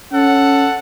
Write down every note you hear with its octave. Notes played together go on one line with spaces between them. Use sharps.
C#4 A4 F#5